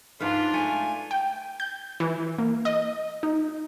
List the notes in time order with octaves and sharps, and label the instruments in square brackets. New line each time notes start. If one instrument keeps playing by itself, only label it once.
[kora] G#2 B4 F5 [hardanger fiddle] D4 F4
[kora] A3 [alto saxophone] G#5
[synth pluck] G5
G6
E3
A#3
D#5
D#4